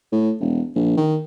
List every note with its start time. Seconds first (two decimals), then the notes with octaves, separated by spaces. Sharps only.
0.12 A2
0.40 E1
0.76 A#1
0.97 D#3